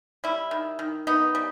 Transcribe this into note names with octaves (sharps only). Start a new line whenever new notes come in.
G3 E4
D#3
D#3
B3 D#4
G3